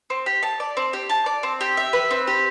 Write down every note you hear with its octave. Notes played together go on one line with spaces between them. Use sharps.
C4
G4
A5
D5
C4
G4
A5
D5
C4
G4
E5
B4
C4
G4